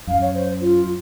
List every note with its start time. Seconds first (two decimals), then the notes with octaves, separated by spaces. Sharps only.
0.07 F#2 F5
0.21 C#5
0.35 C5
0.61 F4